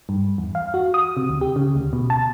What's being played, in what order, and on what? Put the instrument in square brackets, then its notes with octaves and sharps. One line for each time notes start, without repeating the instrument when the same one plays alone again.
[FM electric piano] G2
E2
F5
F#4
D#6
C3
D2
G4
C#3
D2
B2
A5